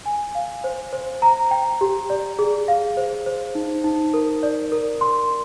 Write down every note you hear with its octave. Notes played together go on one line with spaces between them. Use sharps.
G#5
F5
C5
C5
A#5
G5
G4
D5
G#4
F5
C5
C5
D#4
D#4
A#4
D5
A#4
C6